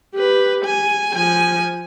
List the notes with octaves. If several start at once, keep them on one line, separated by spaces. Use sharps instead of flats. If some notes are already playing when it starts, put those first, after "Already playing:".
G4 B4
G#5
F3 G#5